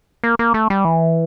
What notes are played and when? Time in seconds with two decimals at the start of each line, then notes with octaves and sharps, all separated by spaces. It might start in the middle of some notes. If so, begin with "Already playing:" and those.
0.24 A#3
0.39 A#3
0.54 A3
0.70 G3
0.85 E3